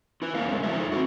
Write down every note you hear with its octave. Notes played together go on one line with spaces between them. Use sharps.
E4 B4
A3 A#3 C#4 A#4 C5 F5
G#3 B3 C#4
F3 F#3 A3 E4 C5 E5
G#3 D#4 A4
C4 D4 F#4